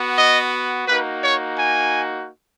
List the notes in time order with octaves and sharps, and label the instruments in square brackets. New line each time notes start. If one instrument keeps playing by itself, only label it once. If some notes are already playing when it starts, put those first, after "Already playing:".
Already playing: [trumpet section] B3 F#4
D#5
A#3 D#4 F#4 B4
C#5
G#5